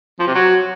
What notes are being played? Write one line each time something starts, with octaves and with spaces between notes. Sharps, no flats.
F3
C3
F#3